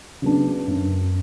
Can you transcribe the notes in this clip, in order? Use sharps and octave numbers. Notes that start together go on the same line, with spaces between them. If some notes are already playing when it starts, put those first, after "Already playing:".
C#3 F#3 B3 D4
F#2